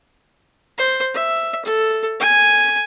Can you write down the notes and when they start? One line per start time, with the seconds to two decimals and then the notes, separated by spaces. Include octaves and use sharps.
0.78 C5
1.14 E5
1.65 A4
2.20 G#5